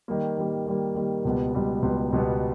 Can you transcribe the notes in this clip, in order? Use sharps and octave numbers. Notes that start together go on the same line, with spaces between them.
D#3 G3 A#3
D#3 G3 A#3
D#3 G3 A#3
D#3 G3 A#3
C#2 B2 G3 B3
C#2 B2 G3 B3
C#2 B2 G3 B3
C#2 B2 G3 B3